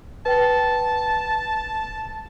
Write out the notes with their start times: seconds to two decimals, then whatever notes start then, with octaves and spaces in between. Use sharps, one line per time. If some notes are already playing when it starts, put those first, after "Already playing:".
0.26 B4 G5 A5